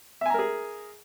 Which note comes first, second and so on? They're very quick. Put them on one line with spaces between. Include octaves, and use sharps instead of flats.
E5 G#5 A#5 A#4 G#4